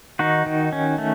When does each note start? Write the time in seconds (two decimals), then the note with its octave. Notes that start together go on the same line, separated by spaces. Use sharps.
0.19 D#3 D#4 F#4
0.46 D#3
0.73 C#4
0.98 A3